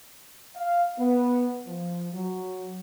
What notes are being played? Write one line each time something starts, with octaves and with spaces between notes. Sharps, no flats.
F5
B3
F3
F#3